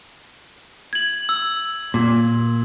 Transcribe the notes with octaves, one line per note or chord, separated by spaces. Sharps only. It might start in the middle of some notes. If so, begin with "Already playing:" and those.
G#6 F#7
E6
A#2